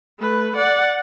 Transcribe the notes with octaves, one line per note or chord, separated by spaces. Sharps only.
A3 B4
D5 F#5